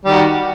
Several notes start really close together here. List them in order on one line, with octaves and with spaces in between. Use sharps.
G3 D#3 F#4